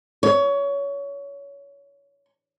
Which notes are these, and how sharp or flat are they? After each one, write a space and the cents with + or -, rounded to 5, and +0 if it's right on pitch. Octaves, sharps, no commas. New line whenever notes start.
C#5 +25